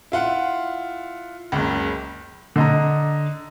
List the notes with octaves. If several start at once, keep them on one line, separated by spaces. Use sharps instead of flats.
E4 F4 F#5
F#1 C#2
D3 D#5 A#5